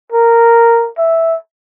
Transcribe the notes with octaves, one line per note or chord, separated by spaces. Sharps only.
A#4
E5